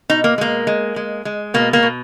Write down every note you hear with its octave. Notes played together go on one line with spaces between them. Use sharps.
B2 D#4
A#3
G#3 A#3
G#3
G#3
G#3
B2 A#3
A#3
B2